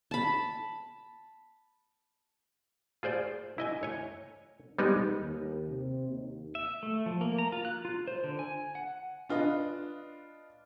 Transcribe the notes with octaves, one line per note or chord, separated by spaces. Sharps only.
A5 B5
F4 G#4 C5 D5
E4 D#5 G#5
C#5 G#5
G3 G#3 B3 D#4 G4 B4
D#2
C3
D#2
E5
A3
F3
A#3
A#5
F4
F#6
F4
C5
D3
G#5
F#5
D4 F4 B4 D#5